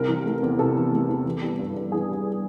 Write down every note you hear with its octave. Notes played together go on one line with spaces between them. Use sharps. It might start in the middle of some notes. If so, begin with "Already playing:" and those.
Already playing: C2 C3 A#4
E3
A3
E2
C3 A4
E3
A3
E2
E3
G3
G2
G2
E3 G#4
G3